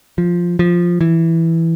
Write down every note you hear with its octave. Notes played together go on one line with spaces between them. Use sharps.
F3
F3
E3